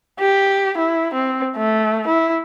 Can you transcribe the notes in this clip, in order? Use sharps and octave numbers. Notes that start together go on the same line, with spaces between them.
G4
E4
C4
A3
E4